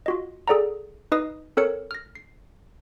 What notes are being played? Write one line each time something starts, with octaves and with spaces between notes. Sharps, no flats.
F4 F#4 D#5
G#4 A4 D5 F#5 A#5
D#4 B4 D#5 D#6 C7
C4 A4 A#4 C#5 C#7
F6 A#6
C7